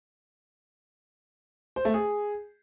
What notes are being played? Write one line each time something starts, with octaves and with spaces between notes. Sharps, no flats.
C5
A3
G#4